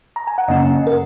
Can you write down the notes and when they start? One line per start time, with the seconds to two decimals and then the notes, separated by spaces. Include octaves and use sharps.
0.16 A#5
0.27 G#5
0.38 F#5
0.48 F#2 C#3 A#3 C#4 D#5
0.87 A#4